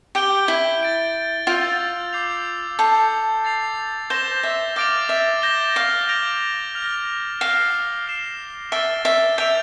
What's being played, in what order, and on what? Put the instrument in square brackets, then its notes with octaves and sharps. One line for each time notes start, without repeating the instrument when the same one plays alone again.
[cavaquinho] G4 [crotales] G6 D7 G7
[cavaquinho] E4
[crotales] A6 D7 G7
[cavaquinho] F4 [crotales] E6 G6 D7 F7
[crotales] D6 G6 C7 F7
[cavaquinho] A4 [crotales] G6 C7 F7
[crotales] A6 C7 F7
[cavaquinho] C5 [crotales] G6 A#6 E7 G7
[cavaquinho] E5
[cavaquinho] F5 [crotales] D6 A6 D7 F7
[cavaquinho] E5
[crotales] G6 A#6 E7 G7
[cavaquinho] F5
[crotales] G6 A#6 D7 F7
F6 A#6 F7
[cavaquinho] F5 [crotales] F6 C7 G7
[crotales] F6 C7 E7
[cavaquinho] E5 [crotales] A6 D7 G7
[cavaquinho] E5
[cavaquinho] E5 [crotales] G6 D7 F7